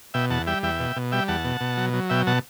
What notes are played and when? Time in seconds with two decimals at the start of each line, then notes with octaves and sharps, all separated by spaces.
0.14 B2 E5 G5
0.30 E2 F#5 A5
0.47 G3 E5 G5
0.63 E2 E5 G5
0.80 B2
0.96 B2
1.12 G3 E5 G5
1.28 E2 F#5 A5
1.45 B2
1.61 B2
1.77 F#3
1.93 F#3
2.10 B2 E5 G5
2.27 B2 F#5 A5